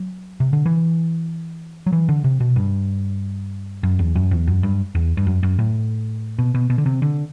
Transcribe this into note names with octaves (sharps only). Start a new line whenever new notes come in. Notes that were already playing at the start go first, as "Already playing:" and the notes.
Already playing: F#3
C3
D3
E3
F#3
E3
D3
C3
B2
G2
F#2
E2
F#2
E2
F#2
G2
E2
G2
F#2
F#2
A2
B2
B2
B2
D3
C3
D3